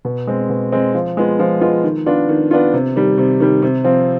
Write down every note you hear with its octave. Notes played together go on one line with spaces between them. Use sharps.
B2
G#3 C4
B2
G#3 C4
F3
G#3 B3 F4
F3
G#3 B3 F4
D#3
B3 D4 F4
D#3
B3 D4 F4
C3
D#3 G3
C3
D#3 G3
C3
F3 C4